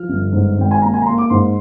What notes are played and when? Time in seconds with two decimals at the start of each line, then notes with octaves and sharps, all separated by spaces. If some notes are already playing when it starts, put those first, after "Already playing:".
Already playing: F3 F6
0.09 G1
0.32 G#2
0.58 G#1 G5
0.71 G#5
0.82 A#3 A#5
0.94 G#5
1.02 A#5
1.05 A#3 C6
1.18 D6
1.30 G#2 C6